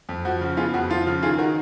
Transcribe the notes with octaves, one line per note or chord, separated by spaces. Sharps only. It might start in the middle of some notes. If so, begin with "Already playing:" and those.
F2
F3 F#4
C#3
B3 F4 G#4
F2 F#4
F3 F4
C#3
D#3 F4 G#4
D#3 F#4 A#4